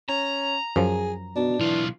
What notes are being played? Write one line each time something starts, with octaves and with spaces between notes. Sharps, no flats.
C#4 A#5
F#2 F3 G#4
B2 D4
B1 E3 F4